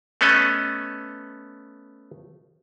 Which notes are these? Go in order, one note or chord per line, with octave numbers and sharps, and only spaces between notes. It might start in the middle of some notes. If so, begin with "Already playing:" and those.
A3 B3 C#4 A4 D#5